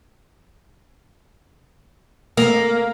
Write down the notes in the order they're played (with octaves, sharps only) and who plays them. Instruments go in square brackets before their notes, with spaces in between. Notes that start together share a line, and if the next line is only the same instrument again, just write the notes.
[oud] A#3